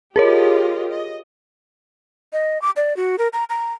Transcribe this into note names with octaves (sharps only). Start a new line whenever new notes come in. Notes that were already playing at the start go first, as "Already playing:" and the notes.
F4 G4 G#4 A#4 C#5 D#5
D#5
D#5
D6
D5
F#4
A#4
A#5
A#5